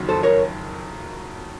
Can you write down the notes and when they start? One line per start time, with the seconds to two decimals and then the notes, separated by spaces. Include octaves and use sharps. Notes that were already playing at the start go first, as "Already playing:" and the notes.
Already playing: F#1 F2 D#3 F#3
0.09 A4 C5
0.23 A#4 C#5